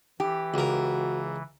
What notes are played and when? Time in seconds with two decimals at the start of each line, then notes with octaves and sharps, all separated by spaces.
0.20 E3 G4
0.54 C#2 F#4 A#4